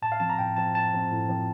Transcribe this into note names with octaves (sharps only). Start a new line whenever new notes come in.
A2 A5
F5
F3 C4 A5
A#5
A2 G5
F3 C4 A5
A2 A5
F3 C4
A2
F3 C4